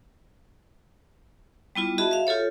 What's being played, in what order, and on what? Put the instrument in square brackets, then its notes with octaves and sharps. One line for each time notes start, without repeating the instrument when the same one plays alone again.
[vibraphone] G3 B3 E4 F4
F#4 G#4 D#5 E5 A5 B5
E5 F5
F4 G4 A4 C#5